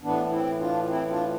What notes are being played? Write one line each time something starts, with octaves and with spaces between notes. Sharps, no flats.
A2 E3 B3 D4
C4 E4
D4 F4
C4 E4
D4 F4